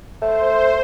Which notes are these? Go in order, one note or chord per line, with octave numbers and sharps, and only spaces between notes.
A3 C5